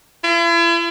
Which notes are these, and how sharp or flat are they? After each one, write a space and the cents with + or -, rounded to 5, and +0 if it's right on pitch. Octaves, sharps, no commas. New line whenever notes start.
E4 +45